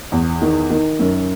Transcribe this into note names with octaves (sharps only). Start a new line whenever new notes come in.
E2
D#3
D#3
F#2